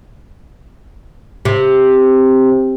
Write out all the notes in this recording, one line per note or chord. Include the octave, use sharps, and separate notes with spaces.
C3